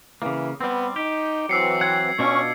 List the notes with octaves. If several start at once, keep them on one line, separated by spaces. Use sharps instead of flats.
C#3 E3 A#3
G3 B3 C4
D#4 G4
E3 F#3 C4 E6 C7 C#7
F#5 G#6
B2 C#4 D4 F4 C#6